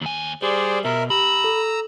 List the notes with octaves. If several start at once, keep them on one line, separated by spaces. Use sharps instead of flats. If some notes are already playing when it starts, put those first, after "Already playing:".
D#2 G#5
G3 G#4 C5 D5
B2 A#4 E5
G4 A#5 B5 E6
A4